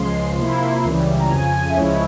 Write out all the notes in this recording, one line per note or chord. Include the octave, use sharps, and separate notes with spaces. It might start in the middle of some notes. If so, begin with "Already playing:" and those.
Already playing: C#2 C#3 F3 G#3 C6
C3 F3 A#3 E4
C#2 C#3 E3 G3
A#5
F2 C#3 F3 G#5
G#5
E5
C#2 C#3 F3 G#3 E4 C#5